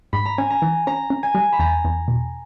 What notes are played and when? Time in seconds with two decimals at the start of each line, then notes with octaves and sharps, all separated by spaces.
0.13 G#2 B5
0.25 A#5
0.38 C#4 G#5
0.50 A#5
0.62 E3
0.87 C#4 A#5
1.10 C#4
1.23 G#5
1.35 G3
1.53 B5
1.59 E2 A#5
1.85 E2
2.08 B2